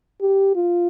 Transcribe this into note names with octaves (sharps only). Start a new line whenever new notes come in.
G4
F4